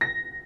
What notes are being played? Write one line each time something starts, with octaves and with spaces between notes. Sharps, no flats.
A#6